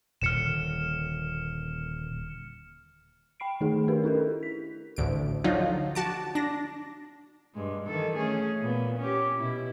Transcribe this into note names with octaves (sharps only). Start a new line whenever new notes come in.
D#1 A#2 D3 F6 C#7 E7
G5 B5 C7 D7
D#3 A3 D#4 G#4
D4 G4 A#4 B4
C#4 E4 A4 A#4
B6
A1 D2 D7
D3 F3 F#3 D#4 F4
F#4 A5 D6
D4 A#6
G2 G#3
D#3 E3 A4
A3 C#4 G#4
A#2 B3
C#4 G4
B2 E4